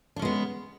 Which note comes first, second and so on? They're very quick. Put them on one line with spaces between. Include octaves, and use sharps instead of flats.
D4 C#4 G#3 B3